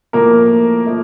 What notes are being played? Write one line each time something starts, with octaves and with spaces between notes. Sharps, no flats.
A2 F3 A3 A#3 A#4
F3 A3